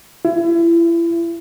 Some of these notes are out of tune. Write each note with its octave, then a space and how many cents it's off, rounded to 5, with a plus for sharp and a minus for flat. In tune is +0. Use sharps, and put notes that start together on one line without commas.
E4 +35